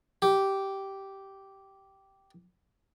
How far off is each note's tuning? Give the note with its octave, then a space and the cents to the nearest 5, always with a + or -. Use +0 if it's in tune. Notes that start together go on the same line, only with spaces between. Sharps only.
G4 -10